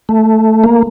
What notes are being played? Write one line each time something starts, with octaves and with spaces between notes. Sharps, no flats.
A3
A#3